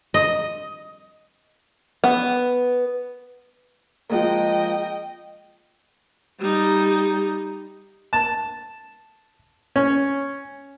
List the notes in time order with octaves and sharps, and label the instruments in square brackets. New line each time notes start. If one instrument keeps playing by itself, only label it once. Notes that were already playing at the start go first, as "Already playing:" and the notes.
[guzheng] D#5
[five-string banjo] B3
[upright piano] F3 G#3 A#3 [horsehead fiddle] D#5 G5
[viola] G3 D#4
[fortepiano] A5
C#4